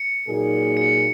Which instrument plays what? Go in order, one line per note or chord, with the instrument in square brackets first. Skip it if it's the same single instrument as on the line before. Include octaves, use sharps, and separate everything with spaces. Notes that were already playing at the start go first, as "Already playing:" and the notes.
Already playing: [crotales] C#7
[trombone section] A#2 F#3 A#3 D#4 G#4
[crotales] C#7